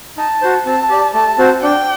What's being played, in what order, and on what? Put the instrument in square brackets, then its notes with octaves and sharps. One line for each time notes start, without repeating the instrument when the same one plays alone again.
[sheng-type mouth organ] D#4 [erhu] A5
[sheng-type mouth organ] F#4 C5
[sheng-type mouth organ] C4 [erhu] A5
[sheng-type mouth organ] G4 D5
[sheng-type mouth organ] A3 [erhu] A5
[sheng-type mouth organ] C4 F#4 C5
[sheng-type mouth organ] D4 [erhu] G5